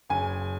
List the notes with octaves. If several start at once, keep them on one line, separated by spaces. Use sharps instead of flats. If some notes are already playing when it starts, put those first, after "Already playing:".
F#1 G#5